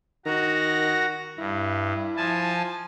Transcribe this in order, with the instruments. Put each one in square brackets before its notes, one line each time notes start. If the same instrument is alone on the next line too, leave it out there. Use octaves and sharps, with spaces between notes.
[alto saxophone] D#3 [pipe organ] F#4 A#5
[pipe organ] G2 [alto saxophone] E4
[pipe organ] F3 G#5 A5